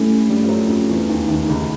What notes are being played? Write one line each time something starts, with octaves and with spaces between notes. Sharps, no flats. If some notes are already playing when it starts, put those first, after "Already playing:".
Already playing: G2 G3 A3 C#4 E4
G2 G3
F3
F#2 F#3
F2 F3
E2 E3
D#2 D#3
D#2 D#3
C#2 C#3